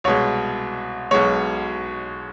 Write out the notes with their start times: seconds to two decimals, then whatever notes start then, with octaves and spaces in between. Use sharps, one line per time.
0.04 C2 B2 G#3 C#5
1.11 B1 B2 G#3 C#5